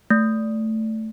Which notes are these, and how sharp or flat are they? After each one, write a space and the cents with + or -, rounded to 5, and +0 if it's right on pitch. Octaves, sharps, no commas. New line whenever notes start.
A3 +0